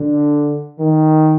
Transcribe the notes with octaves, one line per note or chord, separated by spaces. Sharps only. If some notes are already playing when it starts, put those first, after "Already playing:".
Already playing: D3
D#3